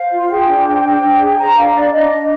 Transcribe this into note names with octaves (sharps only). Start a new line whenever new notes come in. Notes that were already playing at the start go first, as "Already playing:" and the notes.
Already playing: C5 F5
F4
G#4 G5
D4
C5
D4
D4
G#4
C5 A#5
D4 F5
D4 D5
D4 D#5
D4